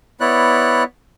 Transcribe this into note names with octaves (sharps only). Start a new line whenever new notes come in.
B3 E4 C#5 D5 F#6